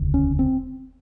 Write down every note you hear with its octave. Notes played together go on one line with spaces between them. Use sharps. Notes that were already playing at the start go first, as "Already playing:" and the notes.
Already playing: E1 D2 C#3
C#4
C4